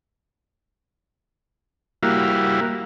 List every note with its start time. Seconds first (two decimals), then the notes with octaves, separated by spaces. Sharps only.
2.03 G3 A#3 E4 F#4 F5